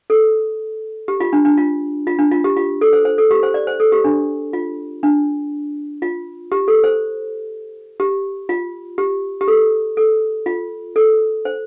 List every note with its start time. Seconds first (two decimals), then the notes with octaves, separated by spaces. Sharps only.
0.10 A4
1.08 G4
1.20 F4
1.33 D4
1.45 D4
1.58 F4
2.07 F4
2.19 D4
2.31 F4
2.44 G4
2.57 F4
2.81 A4
2.93 C5
3.05 C5
3.18 A4
3.31 G4
3.43 C5
3.54 D5
3.67 C5
3.80 A4
3.92 G4
4.04 D4
4.53 F4
5.03 D4
6.02 F4
6.52 G4
6.68 A4
6.84 C5
8.00 G4
8.49 F4
8.98 G4
9.41 G4
9.48 A4
9.97 A4
10.46 F4
10.96 A4
11.45 C5